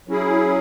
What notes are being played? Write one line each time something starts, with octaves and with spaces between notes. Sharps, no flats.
F#3 C#4 E4 G#4